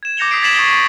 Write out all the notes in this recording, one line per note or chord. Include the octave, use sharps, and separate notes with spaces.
G#6 E7
D6 G6 A#6 C#7 F7 G7
D#6 B6 C7 D7
G#6 A6 B6 C7 E7 F#7
C#6 D#6 A6 D7 G7